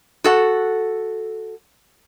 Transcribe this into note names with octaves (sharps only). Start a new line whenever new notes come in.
F#4 A4 F#5